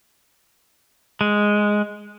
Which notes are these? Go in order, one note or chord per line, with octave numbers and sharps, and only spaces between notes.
G#3